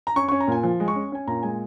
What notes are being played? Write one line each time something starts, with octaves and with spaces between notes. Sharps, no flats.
A#5
C#4 C#6
C#4 C#6
A#5
A#2 G#5
F3
G#3
C#6
C#4
C#4 G#5
A#2 A#5
G#3 G#5